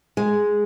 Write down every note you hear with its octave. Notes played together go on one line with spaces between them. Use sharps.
G#3